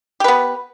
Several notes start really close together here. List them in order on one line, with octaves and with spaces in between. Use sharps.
G4 B4 B3